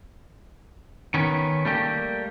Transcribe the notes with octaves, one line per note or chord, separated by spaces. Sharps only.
D#3 B3 C#4
G3 A3 A#3 G4